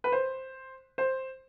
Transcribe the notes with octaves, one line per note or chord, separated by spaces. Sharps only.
B4
C5
C5